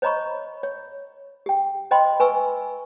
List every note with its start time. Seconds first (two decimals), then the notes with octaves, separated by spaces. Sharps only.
0.02 C5 C#5 D#5 A#5 B5 C#6
0.63 C#5
1.46 G4 G5
1.91 C5 D#5 G5 B5 C6
2.20 B4 G#5 C#6 E6